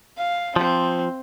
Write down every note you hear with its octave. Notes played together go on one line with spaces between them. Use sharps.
F5
F3 C4